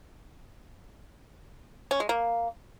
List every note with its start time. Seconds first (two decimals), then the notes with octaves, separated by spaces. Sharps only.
1.91 C#4
2.00 G#3
2.09 A#3